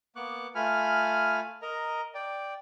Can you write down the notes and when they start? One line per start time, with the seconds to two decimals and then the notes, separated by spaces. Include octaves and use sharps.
0.16 A#3 B3 C#6 D6 F#6
0.55 A3 F4 G#5 B5 F6
1.62 A#4 D#5 A#5
2.15 D5 G5